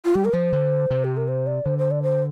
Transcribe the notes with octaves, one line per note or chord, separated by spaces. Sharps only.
F4
G3 G4
A#4
F3 C5
D3
C3
G4
A#4
C5
D5
D3 C5
C5
D5
C5